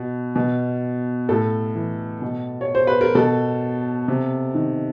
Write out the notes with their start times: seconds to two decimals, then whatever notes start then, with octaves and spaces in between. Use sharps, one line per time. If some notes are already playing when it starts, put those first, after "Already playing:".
Already playing: B2
0.36 B2
1.29 A2 A4
1.75 E3
2.22 B2
2.61 C#5
2.75 C5
2.87 B4
3.01 A#4
3.15 B2 A4
4.08 C3
4.55 D#3